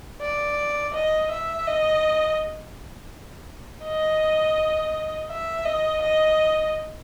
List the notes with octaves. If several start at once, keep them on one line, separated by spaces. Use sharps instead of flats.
D5
D#5
E5
D#5
D#5
E5
D#5
D#5